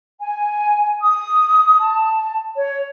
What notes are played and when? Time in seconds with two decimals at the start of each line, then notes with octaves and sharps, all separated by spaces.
0.21 G#5
1.01 D#6
1.80 A5
2.56 C#5